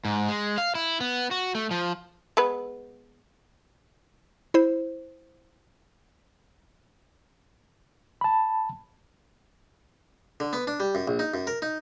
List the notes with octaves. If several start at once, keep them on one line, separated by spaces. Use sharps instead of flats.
G#2
G#3
F5
E4
B3
F#4
A3
F3
G#3 B3 B4
E4 C5
A5 B5
D3
B3
D4
G3
F#2
A#1
D#4
F#2
A#4
D#4